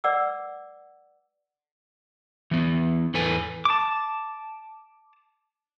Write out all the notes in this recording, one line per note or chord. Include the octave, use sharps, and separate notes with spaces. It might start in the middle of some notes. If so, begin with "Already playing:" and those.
B4 D5 F#5 D6 E6
E3 B3
E2 E3 A4 B4 G#5
A5 D6